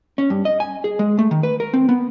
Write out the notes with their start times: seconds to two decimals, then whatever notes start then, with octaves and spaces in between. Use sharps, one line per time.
0.18 C#4
0.30 G2
0.45 D#5
0.60 G#5
0.84 G#4
0.99 G#3
1.19 A3
1.31 D#3
1.43 B4
1.60 A#4
1.74 C4
1.89 B3